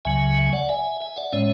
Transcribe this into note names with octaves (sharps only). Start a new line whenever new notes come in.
C#2 C#3 F#3 E5 G#5
G#5
D5 F#5
E5 G#5
E5 G#5
D5 F#5
A2 G#3 C#4 C#5 E5